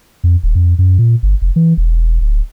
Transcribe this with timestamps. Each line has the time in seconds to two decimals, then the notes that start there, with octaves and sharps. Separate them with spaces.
0.24 F2
0.43 D#1
0.55 F2
0.79 F#2
0.98 A#2
1.23 G1
1.42 F1
1.56 E3
1.77 E1
2.21 D1